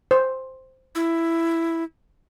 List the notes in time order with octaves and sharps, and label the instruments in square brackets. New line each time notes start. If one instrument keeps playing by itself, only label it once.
[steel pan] C5
[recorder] E4